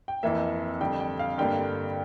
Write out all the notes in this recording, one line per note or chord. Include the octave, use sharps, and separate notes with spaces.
G5
F2 E3 A#3 E5
F2 D3 G3 G5
G5
F5
G2 D3 G3 A#3 G5